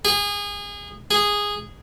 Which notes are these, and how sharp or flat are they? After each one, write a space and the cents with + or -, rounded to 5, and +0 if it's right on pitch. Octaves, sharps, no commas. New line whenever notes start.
G#4 -25
G#4 -10